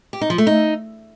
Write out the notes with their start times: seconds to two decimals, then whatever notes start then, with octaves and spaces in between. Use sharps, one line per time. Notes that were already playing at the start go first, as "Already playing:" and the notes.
0.13 G4
0.21 D#4
0.30 F3
0.38 A3
0.47 D#4